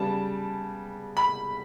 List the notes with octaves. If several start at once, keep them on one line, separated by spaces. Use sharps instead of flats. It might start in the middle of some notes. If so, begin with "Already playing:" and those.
Already playing: C#3 G3 B3 A5
B5